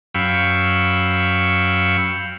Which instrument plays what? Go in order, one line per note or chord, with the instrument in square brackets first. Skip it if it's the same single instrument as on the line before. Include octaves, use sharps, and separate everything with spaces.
[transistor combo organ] F#2 F5 G5 B5 C#6 E6